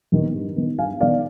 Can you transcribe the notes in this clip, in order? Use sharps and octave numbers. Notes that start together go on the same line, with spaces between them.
D#2 D#3 B3
G2
D#3 B3
G2 F5 G#5
D#3 B3 D5 F5